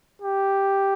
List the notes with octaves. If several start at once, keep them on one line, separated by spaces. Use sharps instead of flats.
G4